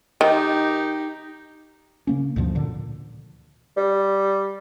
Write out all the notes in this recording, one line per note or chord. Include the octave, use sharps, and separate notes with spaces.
D#3 D#4 G4
C#3 A#3 C#4
D2 G2 B2 F3
A#2 D3
G3